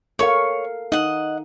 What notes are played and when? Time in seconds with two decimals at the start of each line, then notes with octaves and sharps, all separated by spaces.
0.19 A4 A#4 C#5 F5 C#6
0.92 D#4 D#5 F#5